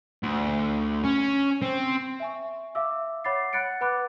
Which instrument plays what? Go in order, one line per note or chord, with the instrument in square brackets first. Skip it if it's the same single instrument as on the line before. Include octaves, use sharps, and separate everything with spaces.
[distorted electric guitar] D2
C#4
C4
[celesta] E5 G#5 C#6
E5 F5 D6 E6
C#5 F#5 B5 D6 A6 C7
F#5 B5 F#6 A6 C#7 D7
B4 F#5 B5 D6 F#6